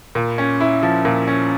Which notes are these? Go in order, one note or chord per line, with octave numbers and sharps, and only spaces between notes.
A#2
C#4
E4
F3
A#2
C#4